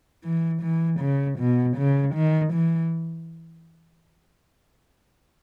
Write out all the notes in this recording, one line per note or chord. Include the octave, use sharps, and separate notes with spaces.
E3
E3
C#3
B2
C#3
D#3
E3